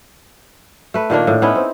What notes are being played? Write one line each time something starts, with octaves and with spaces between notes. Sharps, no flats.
A3 B4
A#2 D#3 A#3 D4
A2
B3 C#4 D#4 E4
C4